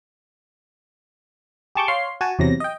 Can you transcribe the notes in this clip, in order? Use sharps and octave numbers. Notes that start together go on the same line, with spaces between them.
G4 G#4 A5 C#6 D6 G6
C#5 F5 C6 C7
F#4 G#5 A5
E2 C3 F#3 A#6
D#5 G5